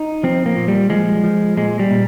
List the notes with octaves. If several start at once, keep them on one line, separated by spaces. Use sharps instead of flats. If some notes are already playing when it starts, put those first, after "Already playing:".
Already playing: D#4
F3 C4
A#3
A#2
G3
F3 G#3
F3
A#2 G#3
G3
A#2